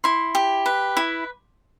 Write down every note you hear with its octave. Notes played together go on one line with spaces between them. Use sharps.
E4 C6
G4
B4
E4